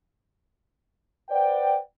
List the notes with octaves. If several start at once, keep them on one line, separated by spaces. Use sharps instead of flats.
B4 C5 D5 F#5 G5